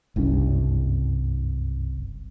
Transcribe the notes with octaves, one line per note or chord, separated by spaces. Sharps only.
F#1 C2 G2 C#4